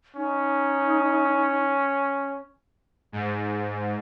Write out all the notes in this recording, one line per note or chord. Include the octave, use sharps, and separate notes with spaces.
C#4 D#4
G#2